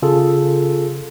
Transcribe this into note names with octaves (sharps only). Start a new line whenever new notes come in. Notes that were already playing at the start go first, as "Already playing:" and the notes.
C#3 F4 G#4 A4